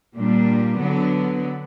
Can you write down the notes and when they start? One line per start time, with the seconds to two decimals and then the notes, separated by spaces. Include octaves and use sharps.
0.14 A#2 G3 A#3 D4
0.78 D3 F#3 B3